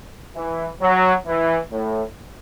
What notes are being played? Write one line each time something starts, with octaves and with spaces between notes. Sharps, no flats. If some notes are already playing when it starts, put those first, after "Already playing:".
E3
F#3
E3
A2